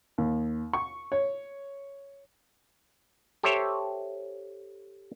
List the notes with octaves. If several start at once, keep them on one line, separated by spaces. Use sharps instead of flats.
D#2
C#6
C#5
G4 A4 C5 C#5 E5